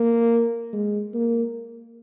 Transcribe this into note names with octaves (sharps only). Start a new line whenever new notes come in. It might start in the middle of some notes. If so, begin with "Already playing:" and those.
Already playing: A#3
G#3
A#3